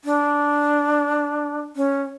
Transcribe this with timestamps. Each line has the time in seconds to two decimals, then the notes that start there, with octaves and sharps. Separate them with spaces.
0.04 D4
1.76 C#4